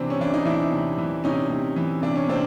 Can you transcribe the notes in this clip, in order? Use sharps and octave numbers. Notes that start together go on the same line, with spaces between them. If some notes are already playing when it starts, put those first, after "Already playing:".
Already playing: C3 E3 C4 D4
C#4
E3 D4
D#4
E3 D4 E4
C3
E3
C3 C#4 D#4
C3
E3
C3 D4
C#4
C3 C4 D4